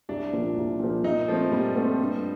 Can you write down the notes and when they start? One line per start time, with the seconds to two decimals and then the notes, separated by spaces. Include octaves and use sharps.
0.09 C2 D4
0.33 A#2 F3
0.57 C2
0.80 A#2 F3
1.04 A#2 D#4
1.28 F3 A3 C4
1.51 A#2 G3
1.76 A3 C4
2.00 G2